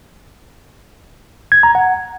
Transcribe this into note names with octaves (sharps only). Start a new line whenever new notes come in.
G#6
A#5
F#5